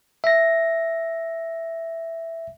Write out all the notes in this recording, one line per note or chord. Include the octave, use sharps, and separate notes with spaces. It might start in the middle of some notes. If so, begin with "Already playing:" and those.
E5 A#6